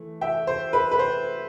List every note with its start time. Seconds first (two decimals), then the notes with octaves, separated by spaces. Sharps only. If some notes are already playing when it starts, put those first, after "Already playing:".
Already playing: E3 A3
0.21 E5 G5
0.47 C5
0.73 B4
0.91 B4
0.99 C5